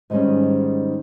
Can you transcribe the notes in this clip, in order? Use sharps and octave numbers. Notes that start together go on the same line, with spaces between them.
G#2 D#3 G3 G#3 C#4